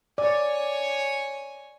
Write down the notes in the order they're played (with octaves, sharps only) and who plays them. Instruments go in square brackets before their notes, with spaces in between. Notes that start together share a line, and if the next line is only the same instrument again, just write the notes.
[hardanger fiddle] C#5 G#5 [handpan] D5